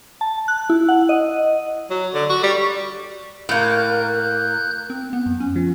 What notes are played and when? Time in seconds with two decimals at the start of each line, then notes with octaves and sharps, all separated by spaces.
0.21 A5
0.48 F#6
0.70 E4
0.89 F#5
1.09 D#5
1.90 F#3
2.14 D3
2.30 F#4
2.43 G3
3.49 A2 A#3 F#6 G6
4.90 C4
5.13 B3
5.26 F#2
5.40 C#4
5.56 F3